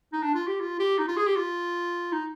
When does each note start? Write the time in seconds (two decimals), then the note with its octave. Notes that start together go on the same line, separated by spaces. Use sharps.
0.13 D#4
0.22 D4
0.35 F4
0.47 G4
0.60 F4
0.79 G4
0.98 D#4
1.08 F4
1.17 G#4
1.27 G4
1.36 F4
2.12 D#4